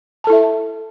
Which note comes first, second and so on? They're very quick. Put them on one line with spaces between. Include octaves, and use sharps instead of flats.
A5 A4 E4 E5